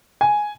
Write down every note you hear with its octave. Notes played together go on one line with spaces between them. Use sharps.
G#5